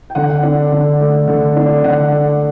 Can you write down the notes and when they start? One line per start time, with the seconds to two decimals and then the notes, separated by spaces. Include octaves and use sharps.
0.10 G5
0.15 D3 F#5
0.43 D4
0.72 D3
1.00 A3
1.27 D3
1.56 D4
1.83 D3 F#5
2.12 A3